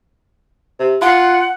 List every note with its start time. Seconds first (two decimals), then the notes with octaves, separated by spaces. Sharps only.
0.79 C3
1.02 F4 F#5